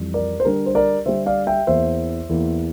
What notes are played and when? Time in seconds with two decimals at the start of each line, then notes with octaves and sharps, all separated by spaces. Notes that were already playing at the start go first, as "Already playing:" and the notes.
Already playing: F2 E3 G3
0.14 A#4 D5
0.40 C5
0.45 D3 G3 D4 A#4
0.66 C5
0.75 A#4 D5
1.06 D3 G3 D4 C5 E5
1.26 D5 F5
1.47 E5 G5
1.67 E2 E3 A#3 E4 C5 E5
2.29 E2 E3 A#3 E4